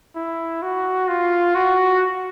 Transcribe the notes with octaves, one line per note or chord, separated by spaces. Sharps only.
E4
F#4
F4
F#4